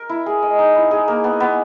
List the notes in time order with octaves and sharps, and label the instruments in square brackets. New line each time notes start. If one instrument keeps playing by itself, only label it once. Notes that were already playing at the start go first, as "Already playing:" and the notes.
Already playing: [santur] A#4
E4
G#4
D#5
D#4
E4
G#4
A#3
B3
B3